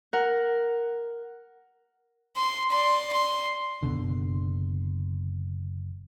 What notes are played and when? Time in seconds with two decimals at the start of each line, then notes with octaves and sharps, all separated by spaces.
0.13 A#4 F#5
2.36 C6
2.70 D5 C6
3.12 C6
3.83 F#1 C#2 B2 D3